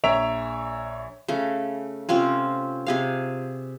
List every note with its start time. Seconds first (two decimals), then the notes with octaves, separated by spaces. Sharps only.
0.04 A#1 C#5 E5 A#5 D7 F7
1.28 C#3 A3
2.09 C3 C4 C#4 F4
2.87 C3 G#4 F5